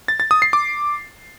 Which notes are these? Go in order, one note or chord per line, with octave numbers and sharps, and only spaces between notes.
A6
A6
D#6
C7
D6